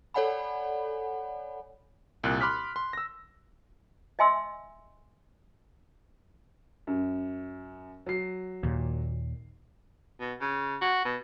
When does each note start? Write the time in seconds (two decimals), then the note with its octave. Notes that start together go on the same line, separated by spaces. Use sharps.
0.14 A4 C#5 D5 F#5 G#5 B5
2.24 C2 A#2 F#6
2.41 B5 C6 D6 F6 F#6 B6
2.76 C6
2.93 E6 A#6
4.19 D#5 E5 G#5 C6 E6
6.87 F#2
8.06 F#3 C7
8.63 D#2 A#2
10.20 B2
10.41 C#3
10.81 F#4
11.05 B2